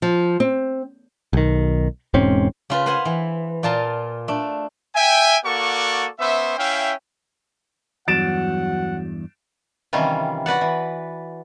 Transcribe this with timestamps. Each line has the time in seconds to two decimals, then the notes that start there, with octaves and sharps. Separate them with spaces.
0.02 F3
0.40 C4
1.33 B1 D#3
2.14 E1 G#2 C4 C#4
2.70 C#3 F4 B4
2.86 B4 C5 F5 F#5 G#5
3.05 E3
3.63 A#2 F4 A5 A#5 C6
4.28 A3 D4
4.95 E5 G5 G#5
5.44 A#3 F#4 A4 D5 F#5 C#6
6.19 B3 C#4 C5 E5
6.57 C#4 E4 E5 F5 G5
8.08 E2 G2 F#3 F#5 A6 D7 E7
9.93 C3 D#3 E3 G3 C#4 F4
10.46 F#4 B4 D5 F#5
10.61 E3